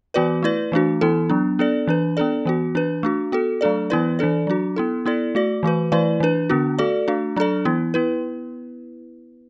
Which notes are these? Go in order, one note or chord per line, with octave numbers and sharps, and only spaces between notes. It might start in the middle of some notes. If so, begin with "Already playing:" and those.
E3 B3 F#4 B4 D5
A3 E4 B4 D5
E3 A3 D4 F#4
E3 B3 E4 A4
F#3 B3 D4
B3 D4 A4 D5
E3 D4 B4
B3 D4 A4 D5
E3 B3 F#4
E3 D4 B4
A3 D4 F#4
B3 F#4 A4
F#3 A3 D4 A4 D5
E3 B3 E4 B4 D5
E3 D4 A4 D5
F#3 D4 F#4
B3 E4 A4
B3 E4 A4 D5
A3 F#4 D5
E3 A3 F#4 B4
E3 A3 E4 B4 D5
E3 D4 B4
D3 B3 D4 F#4
A3 F#4 A4 D5
A3 D4 F#4
F#3 D4 A4 D5
E3 B3 E4
B3 E4 B4